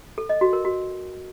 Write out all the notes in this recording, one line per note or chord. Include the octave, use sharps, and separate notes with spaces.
A4
D#5
F#4
A#4
F#4